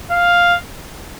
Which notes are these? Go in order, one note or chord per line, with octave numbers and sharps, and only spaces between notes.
F5